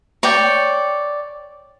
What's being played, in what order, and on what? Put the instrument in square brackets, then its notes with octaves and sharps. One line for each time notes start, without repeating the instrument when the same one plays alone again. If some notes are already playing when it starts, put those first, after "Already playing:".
[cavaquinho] C#5 D5 G5